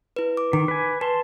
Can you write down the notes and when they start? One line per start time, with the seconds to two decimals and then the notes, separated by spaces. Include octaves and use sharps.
0.16 E4 B4
0.37 D6
0.53 D#3 D6
0.68 B4 G#5
1.01 B4 A5 C6